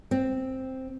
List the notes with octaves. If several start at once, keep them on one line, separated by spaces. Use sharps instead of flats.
C4